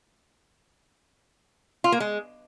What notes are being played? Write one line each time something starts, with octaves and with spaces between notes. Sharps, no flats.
F4
A#3
G#3